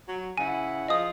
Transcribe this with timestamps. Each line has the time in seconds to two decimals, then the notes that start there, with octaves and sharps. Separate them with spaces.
0.07 F#3
0.38 C#3 E4 F#5 G#5
0.88 F3 G#4 D#5 F5 D#6